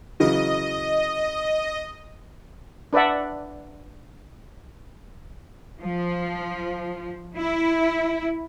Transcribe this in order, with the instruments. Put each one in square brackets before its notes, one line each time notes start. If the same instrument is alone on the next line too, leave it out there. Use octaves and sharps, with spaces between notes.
[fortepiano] C#3 E3 F#3 [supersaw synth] D#5
[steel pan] D4 B4 D5 E5 F#5
[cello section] F3
E4